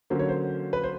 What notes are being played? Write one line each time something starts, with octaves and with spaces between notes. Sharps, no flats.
D3 F#3 A#3 C#4 C5
C#5
C5
B4
C5